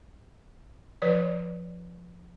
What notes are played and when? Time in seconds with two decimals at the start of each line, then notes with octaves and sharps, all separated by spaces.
1.02 F3 B4 C#5 D5